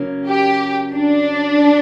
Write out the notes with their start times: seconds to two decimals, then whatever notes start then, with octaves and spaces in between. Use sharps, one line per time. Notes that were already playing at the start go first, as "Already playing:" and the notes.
Already playing: C#3 F#3 A#3 C#4
0.28 G4
0.94 D4